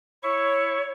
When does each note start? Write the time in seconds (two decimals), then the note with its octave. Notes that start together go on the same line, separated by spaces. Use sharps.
0.23 E4 C#5 C#6